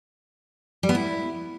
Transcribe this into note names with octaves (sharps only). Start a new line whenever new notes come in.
G3
B3
E4